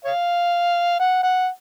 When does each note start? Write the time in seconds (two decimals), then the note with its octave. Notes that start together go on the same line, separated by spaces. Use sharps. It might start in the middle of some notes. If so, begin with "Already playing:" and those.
0.04 C#5 F5
0.99 F#5
1.23 F#5